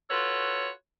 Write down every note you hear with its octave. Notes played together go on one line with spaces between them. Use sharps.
F4 F#4 A4 B4 C#5